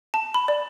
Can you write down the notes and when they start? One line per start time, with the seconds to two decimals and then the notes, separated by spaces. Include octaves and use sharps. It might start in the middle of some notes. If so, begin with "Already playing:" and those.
0.14 A5
0.34 B5
0.48 D5